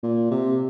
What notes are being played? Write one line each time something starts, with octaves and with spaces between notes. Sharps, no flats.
A#2
C3